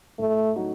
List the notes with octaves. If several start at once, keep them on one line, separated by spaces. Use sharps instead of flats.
A2 A3
F#3 A3 D#4 F#4